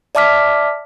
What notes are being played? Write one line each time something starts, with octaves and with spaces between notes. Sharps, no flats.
D5 E5 A5 D6 F6 B6